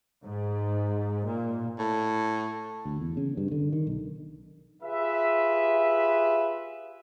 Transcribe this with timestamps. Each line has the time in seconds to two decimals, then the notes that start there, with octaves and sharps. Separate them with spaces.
0.23 G#2
1.25 A#2
1.79 A2
2.85 D2
3.01 E2
3.17 C#3
3.37 G2
3.52 D3
3.73 D#3
3.87 B1
4.83 F4 G4 G#4 B4 E5